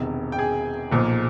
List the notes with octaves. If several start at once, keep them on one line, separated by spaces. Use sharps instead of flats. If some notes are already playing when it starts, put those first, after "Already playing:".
Already playing: E1 E2 C3 D#3
G5
G#4 G#5
B1 A#2 F3